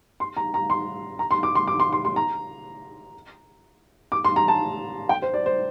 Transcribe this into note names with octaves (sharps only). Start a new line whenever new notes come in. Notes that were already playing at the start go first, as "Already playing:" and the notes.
C6
A#5
A#5
C6
A#5
C6
D6
C6
D6
C6
C6
C6
A#5
D6
C6
A#5
A5
G5
C5
D5
C5